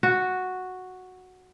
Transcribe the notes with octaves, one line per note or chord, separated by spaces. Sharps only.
F#4